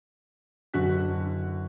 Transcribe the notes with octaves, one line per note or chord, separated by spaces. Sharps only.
F#1 D3 C#4 F#4 F#6 B6